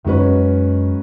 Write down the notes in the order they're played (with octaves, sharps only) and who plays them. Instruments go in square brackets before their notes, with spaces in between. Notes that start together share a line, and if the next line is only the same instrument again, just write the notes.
[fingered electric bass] F#2 [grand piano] D#3 G#3 C#4 F#4 B4